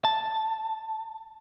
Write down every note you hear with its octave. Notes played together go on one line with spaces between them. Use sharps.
A5